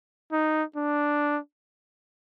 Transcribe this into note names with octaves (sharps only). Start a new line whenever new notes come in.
D#4
D4